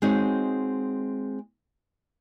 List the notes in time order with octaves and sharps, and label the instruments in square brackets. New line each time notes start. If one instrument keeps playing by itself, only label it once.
[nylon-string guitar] G#3 C4 D#4 F#4 C#5